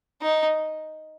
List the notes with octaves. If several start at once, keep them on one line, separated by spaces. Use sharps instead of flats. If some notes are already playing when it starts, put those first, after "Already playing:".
D#4